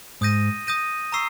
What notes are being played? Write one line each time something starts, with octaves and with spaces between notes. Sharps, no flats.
G#2 D#6 G6 A#6 D#7
D#6 G6 A#6 D#7
A#5 C#6 E6 C7